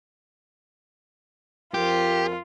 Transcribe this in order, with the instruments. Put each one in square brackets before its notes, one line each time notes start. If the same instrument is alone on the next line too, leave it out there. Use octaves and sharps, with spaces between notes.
[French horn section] F2 F3 A#4 [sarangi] F4 [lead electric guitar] G4